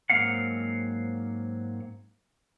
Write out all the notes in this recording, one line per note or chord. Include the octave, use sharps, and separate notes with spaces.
G#2 F#3 A#3 C4 F5 F#5